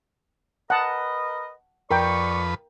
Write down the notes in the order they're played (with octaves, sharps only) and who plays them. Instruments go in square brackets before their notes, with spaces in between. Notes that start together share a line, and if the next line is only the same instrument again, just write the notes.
[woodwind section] A#4 B4 D#5 [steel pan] F#5 A5
[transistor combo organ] F2 B4 [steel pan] A#4 G5 [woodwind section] D5 C#6